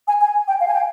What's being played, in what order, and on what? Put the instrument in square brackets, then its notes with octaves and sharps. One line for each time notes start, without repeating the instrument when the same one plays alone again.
[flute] G#5
G#5
G5
F5
G#5
G5